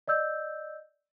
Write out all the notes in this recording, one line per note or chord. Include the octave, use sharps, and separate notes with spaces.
D5 D#5 E6 G6